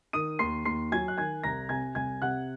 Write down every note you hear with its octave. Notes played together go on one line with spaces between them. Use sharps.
D#3 D#6 D#7
D#2 C6 C7
D#2 C6 C7
F#3 G#5 G#6
F#6
D#3 G#5 G#6
C2 A#5 A#6
C3 G#5 G#6
C2 G#5 G#6
C3 F#5 F#6